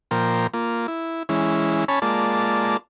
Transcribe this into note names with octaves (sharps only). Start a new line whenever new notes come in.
A#2 F3 A#4 C5 G5
A#3 F4
E4
E3 G#3 C#4 E4
C#4 C#5 G#5 A5 B5
G#3 A#3 F4 D5 A5